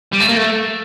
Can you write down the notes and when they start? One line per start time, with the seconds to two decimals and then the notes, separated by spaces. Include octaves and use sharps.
0.13 G3
0.21 A3
0.29 A#3
0.37 A3